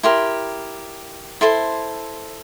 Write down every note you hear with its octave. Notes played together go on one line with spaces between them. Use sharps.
E4 G4 A#4 C6
E4 A4 C5 C6